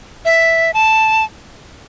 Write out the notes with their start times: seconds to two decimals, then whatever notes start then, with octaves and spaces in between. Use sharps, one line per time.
0.25 E5
0.74 A5